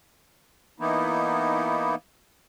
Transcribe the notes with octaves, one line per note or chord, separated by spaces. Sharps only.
E3 A#3 B3 D#4 E4